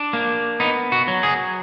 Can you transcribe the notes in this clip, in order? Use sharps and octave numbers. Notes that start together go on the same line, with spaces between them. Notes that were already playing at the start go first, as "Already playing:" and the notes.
Already playing: D4
A#3
B3 D#4
F#4
F#3
G#4